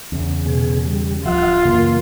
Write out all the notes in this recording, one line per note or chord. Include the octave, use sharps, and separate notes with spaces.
E2 C#3
B2 G#4
G3
D1 F3 F4 E5 F#5
F#2 C#3 E3 A#3